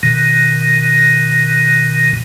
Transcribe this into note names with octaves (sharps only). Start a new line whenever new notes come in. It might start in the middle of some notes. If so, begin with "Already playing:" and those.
B2 D#3